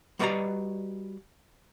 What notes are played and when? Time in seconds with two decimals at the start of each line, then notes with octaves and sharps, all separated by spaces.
0.19 G3 F#4 B4 D5 D#5 A#5